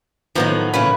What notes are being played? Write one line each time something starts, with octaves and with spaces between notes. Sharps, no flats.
A2 D#3 F3 F#3 B3 D#4
C#3 E3 C#4 B4